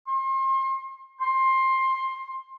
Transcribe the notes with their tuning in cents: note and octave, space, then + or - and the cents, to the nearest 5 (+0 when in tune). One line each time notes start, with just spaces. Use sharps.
C6 +35
C6 +15